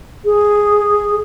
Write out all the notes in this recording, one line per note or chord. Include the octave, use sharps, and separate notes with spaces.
G#4